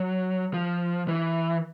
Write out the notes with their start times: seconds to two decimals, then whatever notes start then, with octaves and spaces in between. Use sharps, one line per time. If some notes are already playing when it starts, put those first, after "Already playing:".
Already playing: F#3
0.54 F3
1.08 E3